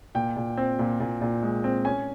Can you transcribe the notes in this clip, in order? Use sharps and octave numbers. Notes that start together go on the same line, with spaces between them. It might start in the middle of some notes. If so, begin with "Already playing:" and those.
A#2 G5
A#2
C4
A#2
A#2
A#2
G#3
C4
C#4 G#5